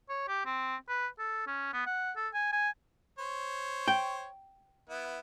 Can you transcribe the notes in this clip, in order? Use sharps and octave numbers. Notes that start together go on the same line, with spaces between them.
C#5
G4
C4
B4
A4
C#4
B3
F#5
A4
G#5
G#5
C5 C#5
G5
B3 E4